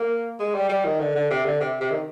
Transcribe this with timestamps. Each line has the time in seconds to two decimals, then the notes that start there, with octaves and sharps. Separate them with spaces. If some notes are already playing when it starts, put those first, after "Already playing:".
Already playing: A#3
0.40 G#3
0.55 G3
0.69 G3
0.85 D#3
1.00 D3
1.15 D3
1.30 C3
1.46 D3
1.60 C3
1.81 C3
1.91 D#3